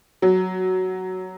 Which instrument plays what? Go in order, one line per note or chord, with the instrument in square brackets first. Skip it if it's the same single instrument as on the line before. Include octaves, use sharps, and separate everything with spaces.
[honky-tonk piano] F#3